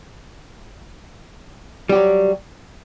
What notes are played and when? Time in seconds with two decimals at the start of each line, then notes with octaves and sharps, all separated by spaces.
1.89 G3
1.92 G4
1.95 F#3